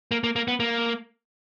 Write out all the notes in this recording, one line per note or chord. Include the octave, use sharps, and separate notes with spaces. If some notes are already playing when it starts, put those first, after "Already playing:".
A#3
A#3
A#3
B3
A#3